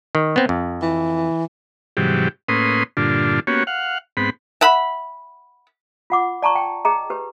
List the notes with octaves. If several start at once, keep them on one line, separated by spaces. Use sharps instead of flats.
D#3
B3 C4
F2
E3
G#2 C3 E3 F#3 G3 G4
A2 A#3 C#4 B4 C6 D#6
G2 A#2 D3 D4 F4
A#3 B3 C#4 F#4 G4 C#5
F5 F#5
G#2 B3 C4 B5
E5 F#5 B5
F4 F#5 D6
D5 A5 A#5 C#6
G5
G#4 D#5 A#5
G4 B4